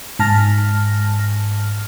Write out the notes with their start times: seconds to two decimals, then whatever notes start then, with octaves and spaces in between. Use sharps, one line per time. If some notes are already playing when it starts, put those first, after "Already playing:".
0.19 G#2 A5 F6 A#6